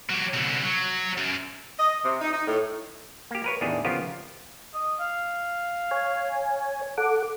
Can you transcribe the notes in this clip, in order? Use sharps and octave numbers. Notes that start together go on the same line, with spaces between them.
F#3 G4
C2 D3
F#3
F#2
D#5
C3
D#4
D#4
A2
A#3 G4
A#4 B4 C#5
A1 E2 D#3 D4 G4 G#4
C#3 F3 B3 F4 G4 A#4
D#5
F5
C#5 G#5
A4 F#5 D6